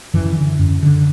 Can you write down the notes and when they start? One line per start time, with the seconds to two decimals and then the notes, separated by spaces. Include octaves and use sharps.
0.14 F#2 E3
0.37 D3
0.59 F#2
0.83 D3